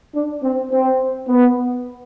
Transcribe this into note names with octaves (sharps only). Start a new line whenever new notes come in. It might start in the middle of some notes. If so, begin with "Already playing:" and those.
D4
C4
C4
B3